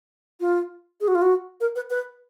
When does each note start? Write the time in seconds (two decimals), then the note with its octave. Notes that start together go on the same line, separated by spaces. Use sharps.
0.40 F4
1.01 G#4
1.08 F#4
1.15 F4
1.22 F#4
1.61 A#4
1.76 B4
1.90 B4